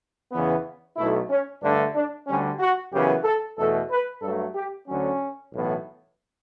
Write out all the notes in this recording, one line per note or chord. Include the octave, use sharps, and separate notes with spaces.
E2 C#3 E3 B3
B1 B2 A3 E4
C#4
G2 D3 A3 D4
D4
D2 D3 G3 C#4
F#4
F#2 C#3 E3 B3 G4
A4
E2 B2 A3 A4
B4
G2 F#3 A3 A4
G4
D2 D3 F#3 C#4
B1 A2 E3 B3